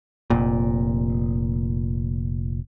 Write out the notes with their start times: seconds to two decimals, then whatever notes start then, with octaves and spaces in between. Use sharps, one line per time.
0.30 F1 A#2